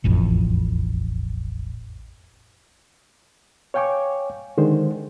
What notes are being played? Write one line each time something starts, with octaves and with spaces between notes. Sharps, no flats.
E1 A1 F2
C#5 F5 G5 G#5 C#6 D6
D3 D#3 G#3 C5